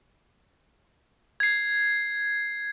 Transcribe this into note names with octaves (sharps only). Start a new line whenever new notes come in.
G#6 C7